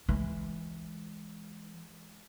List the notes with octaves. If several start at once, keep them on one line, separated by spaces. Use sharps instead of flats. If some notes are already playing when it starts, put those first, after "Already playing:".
E3 G#3